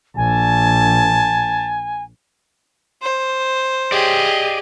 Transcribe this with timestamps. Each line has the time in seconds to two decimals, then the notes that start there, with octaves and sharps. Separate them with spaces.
0.17 A#1 G#5 A5
3.02 C5
3.92 G4 G#4 D5 D#5